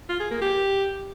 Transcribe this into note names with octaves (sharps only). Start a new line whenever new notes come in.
F4
G#4
A#3
G4